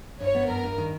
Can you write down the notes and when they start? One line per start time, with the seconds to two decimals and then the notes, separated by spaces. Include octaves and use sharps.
0.20 G2 C#5
0.35 B3
0.49 G2 A#4
0.63 G2
0.78 D#3